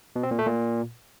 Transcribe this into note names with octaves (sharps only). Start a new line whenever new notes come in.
B2
C4
A#2
A3
A#2